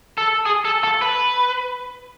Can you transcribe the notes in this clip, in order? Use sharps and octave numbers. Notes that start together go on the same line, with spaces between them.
A4
G#4
A4
A4
B4